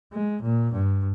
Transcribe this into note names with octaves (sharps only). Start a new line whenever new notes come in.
G#3
A#2
G2